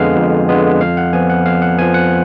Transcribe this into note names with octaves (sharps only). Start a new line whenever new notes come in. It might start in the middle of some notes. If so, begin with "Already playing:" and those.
Already playing: F2 D3 G#3 B3 F5 G#5
F2
D3 G#3 B3
F2 F5
F#5
F3 B3 G#5
F#5
F2 F5
F#5
F3 B3 G#5
F#5